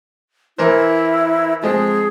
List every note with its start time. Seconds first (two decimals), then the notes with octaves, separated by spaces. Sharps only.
0.58 E3 E4 A#4 C5
1.63 F3 G#3 C4 G#4